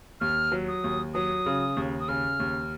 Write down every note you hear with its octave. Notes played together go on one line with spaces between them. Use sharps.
D#2 F6
F#3
D#6
D#2
F#3 D#6
C#3
D#2
D#6
C#3 F6
D#2